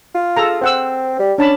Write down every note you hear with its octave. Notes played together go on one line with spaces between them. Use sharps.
F4
G#4 A4 A#5
C4 C5 F#5 E6
G3
C#4 D4 A5 B5